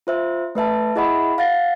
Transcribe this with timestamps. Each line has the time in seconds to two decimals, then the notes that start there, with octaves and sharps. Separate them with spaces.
0.07 F4 C5 E5
0.55 A3 B4 E5 A5
0.96 E4 G#4 D#5 E5 F#5 B5
1.38 F5 F#5 A6 A#6